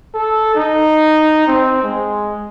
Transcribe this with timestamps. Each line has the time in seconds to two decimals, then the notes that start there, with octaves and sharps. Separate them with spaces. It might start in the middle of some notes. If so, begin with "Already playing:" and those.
0.14 A4
0.55 D#4
1.48 C4
1.83 G#3